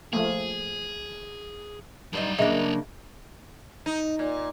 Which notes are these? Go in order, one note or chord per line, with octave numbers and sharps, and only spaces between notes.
F3 A3 A#3 G#4
G2 F#3 G3 D#4 F5
C#3 A#3 D4 G#4 D#5 E5
D#4
A#2